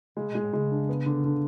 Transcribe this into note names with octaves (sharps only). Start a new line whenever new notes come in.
C#3 G#3
B2
G#3
A2
C#3 G#3
D4
B3
D3
D3